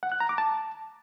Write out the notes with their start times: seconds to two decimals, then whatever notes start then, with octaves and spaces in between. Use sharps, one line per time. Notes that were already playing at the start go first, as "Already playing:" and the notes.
0.03 F#5
0.12 F#6
0.20 A#5
0.29 D6
0.38 A5